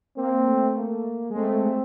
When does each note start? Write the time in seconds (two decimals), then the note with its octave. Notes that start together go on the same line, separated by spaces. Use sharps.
0.17 A#3 C4
0.46 A3
0.76 A#3
1.30 G#3
1.36 A3 C4
1.50 G#3
1.65 A3